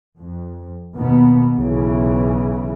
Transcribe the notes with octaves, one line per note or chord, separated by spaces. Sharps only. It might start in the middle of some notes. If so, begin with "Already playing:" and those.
F2
D#2 B2 B3
B1 C#3 E3